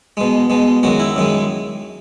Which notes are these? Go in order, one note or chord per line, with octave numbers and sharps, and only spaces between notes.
B2 G#3
B2 G#3
F#2 D#3 G#3 F#4
E4
F#2 D#3 G#3